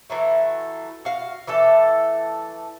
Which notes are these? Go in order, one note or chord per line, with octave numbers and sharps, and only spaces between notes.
E3 F#3 A3
F#4 F5
E3 A3 A4 D5